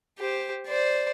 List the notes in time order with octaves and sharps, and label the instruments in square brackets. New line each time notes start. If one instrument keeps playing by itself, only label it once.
[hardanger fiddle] G4 C5
C5 D5